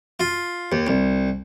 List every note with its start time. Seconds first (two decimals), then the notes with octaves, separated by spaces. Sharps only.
0.20 F4
0.72 D#2
0.87 C2